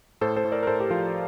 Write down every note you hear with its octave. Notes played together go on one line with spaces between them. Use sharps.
A2 A4 C5
A4 C5
A2
A#4 D5
A#4
A2 A4 C5
G4
F3 F4 A4